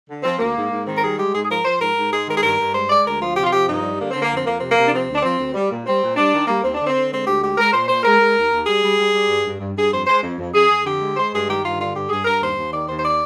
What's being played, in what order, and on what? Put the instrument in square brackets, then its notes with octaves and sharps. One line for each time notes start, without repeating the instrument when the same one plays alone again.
[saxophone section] D3
F3 C4
D2 A#3
G#2
G#2
D#3 C4
A#4
G3 G#4
G#3 G4
G#2 G#4
G#4
F3 A#4
F3 C5
G#2 A#4
G#2
G#3 G#4
D#3 A#4
G#4
G2 A#4
G2
G#3 C5
G#3 D5
D2 A#4
F3 F4
C3 G4
F4
F3 G4
G2 D#4
G3
D3 A#3
D3 C4
A#3
F2 C4
F2 A#3
C3 C4
A#3
C3
D4
F3 C4
D2
D4
F3 C4
D2
G3
A#2
G3 C4
A#2
G3 D4
D#3
G3 A#3
D#2 C4
D3 D4
C4
D3
G#3 C4
D2 G4
G#3 G4
G#3 A#4
A#2 C5
A#2 C5
G#3 A#4
G#3
D#2
D#2
G3 G#4
G3
G3
G3
G2
G2
G2
G2 G#4
F2 C5
G#3 C5
F2
F2
F2 G#4
F2
D3 G4
G#3
G#3 C5
G2 G#4
D#3 G4
G2 F4
D3 F4
G2 G4
G2 G#4
G2 A#4
D#2 C5
D#2
D#3 D5
D#2 C5
C5
D5